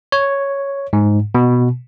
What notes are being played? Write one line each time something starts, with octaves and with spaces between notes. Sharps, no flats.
C#5
G#2
B2